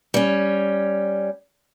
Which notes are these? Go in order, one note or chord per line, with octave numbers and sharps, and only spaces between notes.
G3 C#4